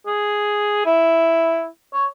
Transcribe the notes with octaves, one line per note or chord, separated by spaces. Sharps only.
G#4
E4
C#5